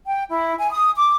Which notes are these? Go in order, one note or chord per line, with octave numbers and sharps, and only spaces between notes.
G5
E4
G#5
D#6
D6